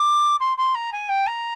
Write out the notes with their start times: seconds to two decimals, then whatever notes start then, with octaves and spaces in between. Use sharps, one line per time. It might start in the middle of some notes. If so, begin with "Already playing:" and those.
Already playing: D6
0.40 C6
0.57 C6
0.75 A#5
0.92 G#5
1.09 G5
1.27 A#5